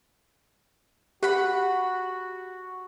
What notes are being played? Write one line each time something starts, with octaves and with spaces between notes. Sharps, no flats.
F#4 G4 F#5 B5